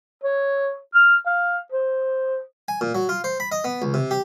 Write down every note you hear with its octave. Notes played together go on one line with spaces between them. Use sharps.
C#5
F6
F5
C5
G#5
A#2
F#3
F4
C5
B5
D#5
B3
C#2
C3
G4